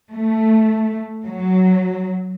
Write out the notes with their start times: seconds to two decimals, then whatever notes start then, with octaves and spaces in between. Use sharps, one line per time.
0.13 A3
1.26 F#3